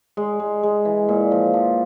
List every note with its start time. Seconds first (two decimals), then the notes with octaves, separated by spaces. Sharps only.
0.17 G#3
0.40 G#3
0.63 G#3
0.85 E3
1.09 A#2
1.31 F3
1.54 F3